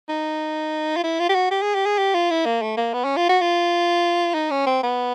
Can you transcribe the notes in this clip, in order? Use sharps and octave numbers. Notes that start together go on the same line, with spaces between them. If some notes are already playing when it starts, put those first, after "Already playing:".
D#4
F4
E4
F4
G4
F#4
G4
G#4
G4
G#4
G4
F4
E4
A#3
A3
A#3
B3
C#4
F4
F#4
F4
D#4
C#4
C4
B3